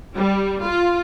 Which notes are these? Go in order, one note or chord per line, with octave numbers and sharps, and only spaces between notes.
G3
F4